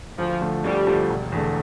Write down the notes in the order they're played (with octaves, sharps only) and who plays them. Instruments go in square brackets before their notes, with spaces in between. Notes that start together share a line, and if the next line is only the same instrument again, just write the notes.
[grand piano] D2 [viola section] F3
[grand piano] D3 F3 A3
[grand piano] D2 [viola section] G3
[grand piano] D3 F3 A3
E1
E2 D3 A3